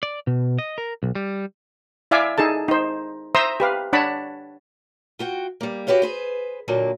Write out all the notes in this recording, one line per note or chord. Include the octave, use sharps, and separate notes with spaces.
D5
B2
D#5
A#4
B1
G3
E4 D5 E5 F5 G#5 D6
D#4 G#4 A4 A5
D#4 C5
C5 E5 A#5 C6 D#6 E6
G4 B4 F5
D4 C#5 F#5 A5 B5
F4 F#4 G5
G3 A#3
F#4 G4 B4 C#5 F5
G#4 B4 C5
A#2 D3 F#3 A#3